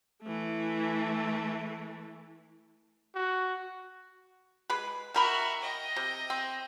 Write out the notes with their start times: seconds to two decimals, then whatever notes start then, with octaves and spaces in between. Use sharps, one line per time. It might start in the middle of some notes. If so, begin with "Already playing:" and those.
0.23 E3 A3
3.15 F#4
4.70 G#3 G#4 B4
5.14 D#3 F#4 A#4 E5 B5
5.61 D#5 G5
5.96 C3
6.30 C4